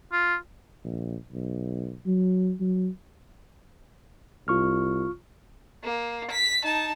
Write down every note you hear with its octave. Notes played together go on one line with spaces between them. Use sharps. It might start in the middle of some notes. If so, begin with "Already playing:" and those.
F4
A#1
B1
F#3
F#3
C2 F4 C#6 F6
A#3
B6
D#4 A5